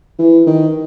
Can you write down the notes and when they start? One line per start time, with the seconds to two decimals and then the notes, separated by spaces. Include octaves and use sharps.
0.19 E3
0.47 D#3